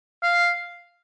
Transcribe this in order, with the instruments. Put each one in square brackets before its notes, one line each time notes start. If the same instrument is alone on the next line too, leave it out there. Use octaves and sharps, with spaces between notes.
[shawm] F5